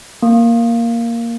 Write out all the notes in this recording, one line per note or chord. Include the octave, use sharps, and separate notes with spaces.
A#3